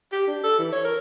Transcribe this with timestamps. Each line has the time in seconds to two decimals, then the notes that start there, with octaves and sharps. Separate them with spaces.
0.12 G4
0.28 D4
0.44 A4
0.59 E3
0.72 C#5
0.85 A#4